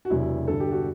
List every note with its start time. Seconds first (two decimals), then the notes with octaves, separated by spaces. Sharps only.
0.05 F#4
0.10 E1 E2 C3 F#3 E4
0.48 G1 G2 D3 A4
0.60 G4
0.71 F#4